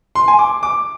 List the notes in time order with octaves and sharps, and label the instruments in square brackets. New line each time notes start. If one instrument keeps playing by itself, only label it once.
[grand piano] C6
G#5
D6
D6